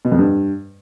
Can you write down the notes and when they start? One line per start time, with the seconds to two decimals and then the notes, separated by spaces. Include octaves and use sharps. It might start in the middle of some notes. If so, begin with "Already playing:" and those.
0.05 B2
0.12 F2
0.19 G2